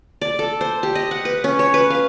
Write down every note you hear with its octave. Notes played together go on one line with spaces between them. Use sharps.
D5
A4
C5
G4
D#5
F#5
B4
C#4
C#5
B4
F5